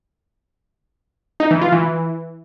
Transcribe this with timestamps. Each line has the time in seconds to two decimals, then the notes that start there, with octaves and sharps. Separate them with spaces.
1.40 D#4
1.51 E3
1.61 F4
1.72 E3